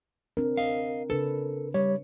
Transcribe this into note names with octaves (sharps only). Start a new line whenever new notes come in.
C4 D4 A#4
D#5 F5
C#3 D4 A4 B4
G3 C#5